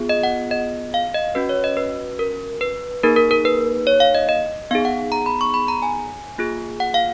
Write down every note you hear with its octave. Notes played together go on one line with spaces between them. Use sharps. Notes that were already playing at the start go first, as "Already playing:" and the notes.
Already playing: B3 F4 G#4
D#5
F#5
D#5
F5
D#5
C#4 F#4 B4
C#5
D#5
B4
A#4
B4
A#3 D#4 G#4 A#4
A#4
A#4
B4
C#5
F5
D#5
D#5
B3 D#4 G#4 F5
F#5
A#5
B5
C#6
B5
A#5
G#5
A#3 F4 G#4
F#5
F5